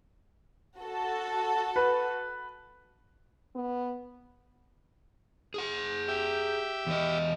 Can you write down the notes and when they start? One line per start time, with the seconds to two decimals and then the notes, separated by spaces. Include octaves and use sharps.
0.78 F#4 A4
1.76 B4
3.55 B3
5.54 G#4 F#5
6.08 G4 E5
6.87 E2 D#5